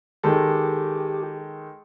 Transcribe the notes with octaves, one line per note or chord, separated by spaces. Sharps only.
D#3 G#3 G4 A4